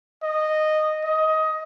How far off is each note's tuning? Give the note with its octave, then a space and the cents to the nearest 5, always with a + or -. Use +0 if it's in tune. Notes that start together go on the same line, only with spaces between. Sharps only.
D#5 -10
D#5 +15